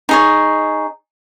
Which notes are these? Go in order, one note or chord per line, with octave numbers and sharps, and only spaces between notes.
D#4 G#4 C#5